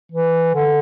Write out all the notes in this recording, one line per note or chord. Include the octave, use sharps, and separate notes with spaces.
E3
D3